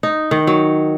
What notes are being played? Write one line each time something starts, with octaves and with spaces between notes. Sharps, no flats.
D#4
D#3
F#3